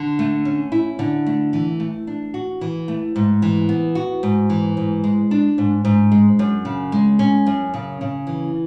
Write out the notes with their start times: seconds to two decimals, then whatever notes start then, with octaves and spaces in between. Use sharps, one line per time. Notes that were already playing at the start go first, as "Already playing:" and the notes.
Already playing: D3
0.19 A3
0.45 C#4
0.72 E4
0.99 D3
1.26 A3
1.53 E3
1.80 A3
2.07 D4
2.34 F#4
2.61 E3
2.88 A3
3.16 G#2
3.42 E3
3.69 B3
3.95 F#4
4.23 G#2
4.50 E3
4.77 G#2
5.04 G#3
5.31 D4
5.58 G#2
5.85 G#2
6.12 G#3
6.39 F#2
6.65 C#3
6.92 G#3
7.19 C#4
7.46 F#2
7.74 C#3
8.01 C#3
8.27 E3